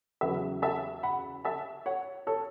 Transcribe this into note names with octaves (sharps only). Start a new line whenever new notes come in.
E2 C#3 F#3 B4 E5
E5 A5
F#5 B5
E5 A5
C#5 F#5
A4 C#5